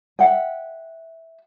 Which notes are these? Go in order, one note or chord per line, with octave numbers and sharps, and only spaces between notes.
E5 F#5 G5